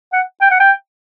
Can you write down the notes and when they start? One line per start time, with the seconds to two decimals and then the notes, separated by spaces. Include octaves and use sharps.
0.13 F#5
0.41 G5
0.51 F#5
0.60 G5